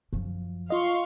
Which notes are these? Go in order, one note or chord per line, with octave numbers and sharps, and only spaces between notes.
F#2 F3
F4 D#5 F5 C6 C#6